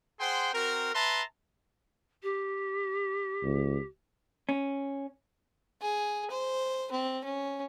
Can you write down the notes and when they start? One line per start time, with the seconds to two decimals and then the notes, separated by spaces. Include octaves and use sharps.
0.20 G#4 C5 F#5 G5 C6
0.54 C4 F#4 A#4
0.95 B4 E5 A5 A#5 C6
2.23 G4
3.43 C#2
4.49 C#4
5.82 G#4
6.30 C5
6.92 C4
7.24 C#4